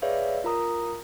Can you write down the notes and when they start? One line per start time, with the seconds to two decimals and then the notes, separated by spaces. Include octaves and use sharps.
0.02 G#4 B4 C#5 D5 E5 F5
0.44 F4 A#4 A#5 D#6